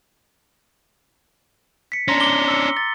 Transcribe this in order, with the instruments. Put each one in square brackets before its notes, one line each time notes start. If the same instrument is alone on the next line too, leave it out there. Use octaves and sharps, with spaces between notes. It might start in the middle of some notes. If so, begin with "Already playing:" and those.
[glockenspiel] B6 C#7
[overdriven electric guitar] C#4 D4 [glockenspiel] A#5 C6 A#6
[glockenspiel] D6 G7
E6 C#7
A6